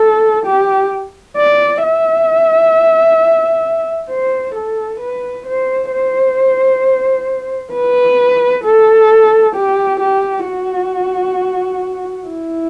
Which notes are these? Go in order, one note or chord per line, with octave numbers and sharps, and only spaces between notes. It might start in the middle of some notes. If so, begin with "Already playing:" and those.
Already playing: A4
G4
D5
E5
C5
A4
B4
C5
C5
B4
A4
G4
G4
F#4
E4